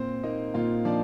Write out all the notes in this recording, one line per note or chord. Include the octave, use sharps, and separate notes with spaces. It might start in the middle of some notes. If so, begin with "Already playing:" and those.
Already playing: A#2 C4 C5
A#3 D#4 D#5
A#2 F4 F5
F3 D4 D5